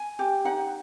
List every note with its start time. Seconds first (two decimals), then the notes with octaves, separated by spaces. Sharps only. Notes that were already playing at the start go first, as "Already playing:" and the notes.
Already playing: G#5
0.19 G4
0.45 D#4 F#5